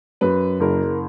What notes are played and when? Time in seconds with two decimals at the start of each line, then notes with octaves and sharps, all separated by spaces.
0.21 F#2 B4
0.60 F#1 A#4